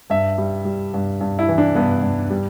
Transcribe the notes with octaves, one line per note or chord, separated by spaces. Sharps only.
G2 E5
G3
G3
G2
G2
E4
E3
D4
G2 B3
G2
G3